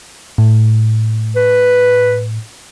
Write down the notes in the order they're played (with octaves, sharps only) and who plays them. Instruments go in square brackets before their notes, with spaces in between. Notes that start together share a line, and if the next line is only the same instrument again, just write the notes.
[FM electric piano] A2
[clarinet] B4